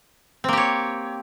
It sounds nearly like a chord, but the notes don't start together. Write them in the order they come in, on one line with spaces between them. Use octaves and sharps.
C4 A#3 G4 C#5